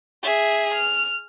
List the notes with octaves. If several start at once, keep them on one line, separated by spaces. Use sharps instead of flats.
G#4 E5
F6